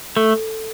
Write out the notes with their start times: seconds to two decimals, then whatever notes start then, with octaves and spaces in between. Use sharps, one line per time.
0.16 A3 A4